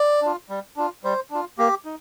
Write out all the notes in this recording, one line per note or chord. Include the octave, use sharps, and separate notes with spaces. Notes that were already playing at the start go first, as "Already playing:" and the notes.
Already playing: D5
D4 F4
G3
D4 F4
G3 C5
D4 F4
A#3 G4
D#4